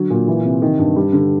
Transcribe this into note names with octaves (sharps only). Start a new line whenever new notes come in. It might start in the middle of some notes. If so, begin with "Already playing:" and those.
Already playing: D3 F#3
A#2
E3
C3
D#3
G2
G3
D3